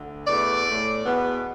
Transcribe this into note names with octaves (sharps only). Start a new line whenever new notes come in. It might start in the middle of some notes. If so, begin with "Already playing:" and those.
Already playing: D2 D3
E2 E3 A3 D5
A2 A3
E2 B2 B3